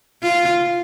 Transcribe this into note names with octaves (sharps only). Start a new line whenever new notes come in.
F4